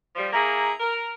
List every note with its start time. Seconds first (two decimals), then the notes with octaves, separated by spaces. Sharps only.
0.16 F3 G3
0.33 A#3 E4 G#4 A#5
0.80 A#4